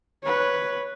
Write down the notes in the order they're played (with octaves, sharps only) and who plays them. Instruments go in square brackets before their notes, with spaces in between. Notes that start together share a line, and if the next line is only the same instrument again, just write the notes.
[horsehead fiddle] B4 C#5